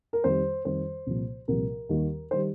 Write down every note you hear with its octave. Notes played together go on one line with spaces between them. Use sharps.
A#4
F2 D#3 G3 C5
F2 D#3 G3 C5
C2 A#2 F3
C2 A#2 F3 A#4
D#2 D#3 G3
D#3 G3 C5